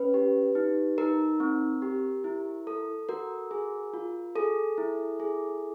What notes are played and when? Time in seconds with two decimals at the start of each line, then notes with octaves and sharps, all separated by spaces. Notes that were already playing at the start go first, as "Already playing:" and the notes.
Already playing: C#4 B4
0.14 G4
0.55 D#4
0.98 D#4 A#4
1.40 C4
1.82 G4
2.24 E4
2.67 A4
3.09 F#4 A#4
3.51 G#4
3.93 F4
4.36 G#4 A4
4.78 E4
5.20 G#4